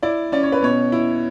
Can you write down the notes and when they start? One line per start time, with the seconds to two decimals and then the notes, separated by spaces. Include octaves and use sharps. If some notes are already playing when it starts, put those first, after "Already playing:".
0.03 E4 D5
0.32 C#4 D5
0.43 C#5
0.52 B4
0.62 B2 C#5
0.92 E4